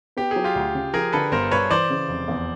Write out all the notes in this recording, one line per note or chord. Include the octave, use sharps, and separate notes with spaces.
B3 G4
F#3 G#4
F4 G4
D2
C#3
F3 G#4 A#4
D3 A4 B4
G1 A#4 C5
G2 B4 C#5
E3 C5 D5
C#3
F1
E2